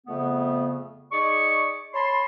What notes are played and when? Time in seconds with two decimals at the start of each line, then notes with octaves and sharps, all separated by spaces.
0.07 F2 C#3 A3 B3
1.11 D#4 G#4 D5 C#6
1.93 C#5 A5 B5 C6